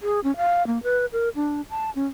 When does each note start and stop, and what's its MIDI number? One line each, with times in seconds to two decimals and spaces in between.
0.01 0.20 68
0.24 0.35 61
0.37 0.66 77
0.67 0.81 58
0.83 1.06 71
1.13 1.29 70
1.36 1.61 62
1.70 1.90 81
1.95 2.06 61